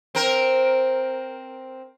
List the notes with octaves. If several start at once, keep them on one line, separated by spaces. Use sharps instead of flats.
C4 A#4